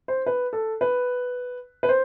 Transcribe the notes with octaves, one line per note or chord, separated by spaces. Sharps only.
C5
B4
A4
B4
B4
C5